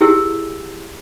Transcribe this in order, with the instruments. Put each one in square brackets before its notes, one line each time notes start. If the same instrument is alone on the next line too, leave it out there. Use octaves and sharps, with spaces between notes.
[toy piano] E4 G4 G#4 A#4 E6